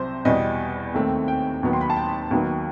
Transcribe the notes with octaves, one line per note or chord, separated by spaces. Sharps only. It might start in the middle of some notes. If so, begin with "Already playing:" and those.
Already playing: C2 C3 F#3 C5
E2 B2 G3 D#5
D#2 D#3 A3 C4
G5
D#2 D#3 F#3 B3
C6
B5
A5
G5
D#2 D#3 F#3 B3